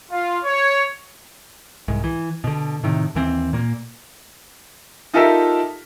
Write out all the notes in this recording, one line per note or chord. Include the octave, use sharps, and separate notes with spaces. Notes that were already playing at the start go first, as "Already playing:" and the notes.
F4
C#5
C2 G#2
E3
B2 D3
A2 C3 D#3
D#2 E3 C4
A#2 A#3
D#4 F4 G4 A4 A#4 E5